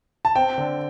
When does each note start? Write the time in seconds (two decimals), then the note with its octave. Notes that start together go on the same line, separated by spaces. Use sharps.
0.25 A5
0.35 C4 G5
0.58 D3